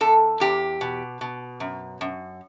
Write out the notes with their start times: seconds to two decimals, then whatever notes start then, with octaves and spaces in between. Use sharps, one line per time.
0.01 E2 A4
0.40 E2 G4
0.81 B2
1.21 B2
1.60 F#2
2.01 F#2